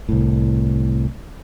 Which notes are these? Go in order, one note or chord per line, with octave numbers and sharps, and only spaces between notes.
C2 A2